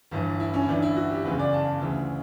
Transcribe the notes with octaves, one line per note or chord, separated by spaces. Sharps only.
G1 G2 E3
E4
C#4
E4
G1 G2 E3 D4
E4
F#4
G4
F#1 E2 C#3 B4
D5
A5
D2 C#3 E3